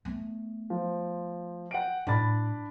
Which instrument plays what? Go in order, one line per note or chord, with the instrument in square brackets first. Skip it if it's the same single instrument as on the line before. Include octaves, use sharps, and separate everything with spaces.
[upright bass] A3 B3
[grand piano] F3
F#5 G5 D7
[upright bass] A2 [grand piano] D4 B5 A6